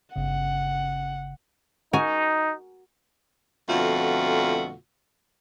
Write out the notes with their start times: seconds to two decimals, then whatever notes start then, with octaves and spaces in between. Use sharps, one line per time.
0.16 G1 C#3 F#5
1.93 D#4 F#4 A#4 G#5
3.69 F2 B2 D3 A3 F4 F#4